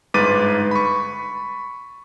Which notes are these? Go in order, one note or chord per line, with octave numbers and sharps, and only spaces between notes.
G1 G#2 B4 D6 A6 D#7
B5 C#6